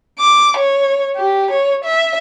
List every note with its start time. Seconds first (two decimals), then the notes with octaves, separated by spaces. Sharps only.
0.19 D6
0.57 C#5
1.16 G4
1.51 C#5
1.85 E5